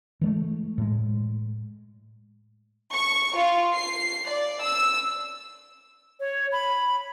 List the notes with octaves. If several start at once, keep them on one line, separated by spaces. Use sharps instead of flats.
E3 G#3 A3
A2 G#3
C#6
F4
C7
D5
E6
C#5
B5